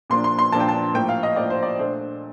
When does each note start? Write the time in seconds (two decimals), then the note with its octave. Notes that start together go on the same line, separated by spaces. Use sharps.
0.10 A#2 F3 A#3 D4 C6
0.24 C6
0.39 C6
0.52 A#2 F3 A#3 D4 A5
0.60 G5
0.68 A5
0.94 A2 F3 A#3 G5
1.09 F5
1.23 D#5
1.36 A2 F3 A#3 D5
1.50 C5
1.63 D5
1.79 A#2 A3 D4 C5